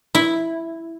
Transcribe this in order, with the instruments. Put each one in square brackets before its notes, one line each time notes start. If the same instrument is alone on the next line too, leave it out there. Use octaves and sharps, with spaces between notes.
[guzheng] E4